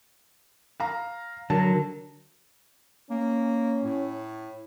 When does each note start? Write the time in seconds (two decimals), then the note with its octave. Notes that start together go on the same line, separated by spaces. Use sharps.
0.80 F5 A#5
1.50 D3 F#3 A#4 A5
3.11 A#3 C#4
3.84 A2